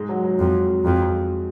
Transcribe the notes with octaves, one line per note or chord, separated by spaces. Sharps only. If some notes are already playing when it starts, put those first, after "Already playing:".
Already playing: G#2 G#3
F#3
F#3
F2
F2